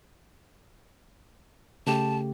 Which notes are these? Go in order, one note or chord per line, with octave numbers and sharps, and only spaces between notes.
C#3 A3 G4 A5